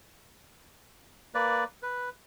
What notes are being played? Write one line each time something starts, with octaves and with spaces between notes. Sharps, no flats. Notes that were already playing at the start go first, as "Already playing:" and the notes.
A#3 B4 D5
B4